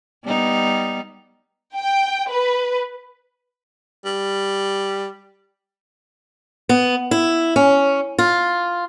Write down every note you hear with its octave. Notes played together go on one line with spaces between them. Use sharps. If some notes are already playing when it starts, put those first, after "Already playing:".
G3 B3 D#4
G5
B4
G3
B3
E4
C#4
F4